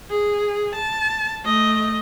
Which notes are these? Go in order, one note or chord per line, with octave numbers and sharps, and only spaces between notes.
G#4
A5
A3 D#5